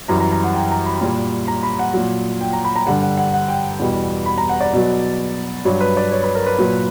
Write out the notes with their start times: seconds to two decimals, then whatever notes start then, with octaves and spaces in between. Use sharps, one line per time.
0.08 F#2 E3 G3 A#5
0.20 A#5
0.32 A#5
0.44 F#5
0.54 G5
0.71 A#5
0.86 B5
1.01 A#2 G3
1.48 A#5
1.63 B5
1.79 F#5
1.94 A#2 F#3
2.41 G5
2.53 A#5
2.64 B5
2.76 A#5
2.87 G2 D3 G3 F#5
3.03 F#5
3.17 F#5
3.34 F#5
3.48 G5
3.79 E2 B2 G3
4.26 B5
4.38 A#5
4.49 F#5
4.61 D5
4.73 B2 F#3
5.65 G2 F#3 C#5
5.81 B4
5.97 D5
6.11 C#5
6.24 B4
6.35 A#4
6.46 B4
6.59 A#2 F#3